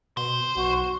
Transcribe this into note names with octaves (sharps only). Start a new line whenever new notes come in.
B2 C5
B1 F#4